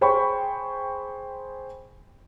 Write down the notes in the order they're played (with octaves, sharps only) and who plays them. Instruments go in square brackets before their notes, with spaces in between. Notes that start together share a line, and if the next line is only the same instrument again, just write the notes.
[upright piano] G#4 C5 G5 B5 C#6